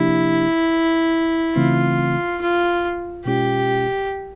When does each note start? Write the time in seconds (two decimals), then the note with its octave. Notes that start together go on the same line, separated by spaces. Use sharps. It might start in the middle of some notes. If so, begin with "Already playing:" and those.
Already playing: C3 F3 A#3 D4 E4 G4
1.56 C#3 E3 A3 C4 F4
2.42 F4
3.25 B2 G#3 C#4 F4 G4